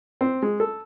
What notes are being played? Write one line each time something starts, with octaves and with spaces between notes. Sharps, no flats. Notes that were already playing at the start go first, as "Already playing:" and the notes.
C4
G#3
A4